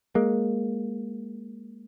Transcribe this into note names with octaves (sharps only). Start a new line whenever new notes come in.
G#3 A#3